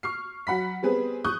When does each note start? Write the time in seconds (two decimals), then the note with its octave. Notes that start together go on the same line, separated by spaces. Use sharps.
0.03 C#6 F6 C7
0.47 F#3 F#5 B5 B6
0.83 G3 B3 C4 G#4 B4
1.24 C#6 D#6 F#6 G6